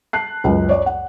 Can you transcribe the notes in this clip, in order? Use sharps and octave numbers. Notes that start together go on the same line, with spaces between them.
A5 F#6 C7
C#2 F#2 B4
C#5 D5
F#5